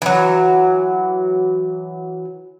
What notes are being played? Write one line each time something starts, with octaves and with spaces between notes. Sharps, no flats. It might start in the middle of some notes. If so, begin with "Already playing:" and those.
E3 F#3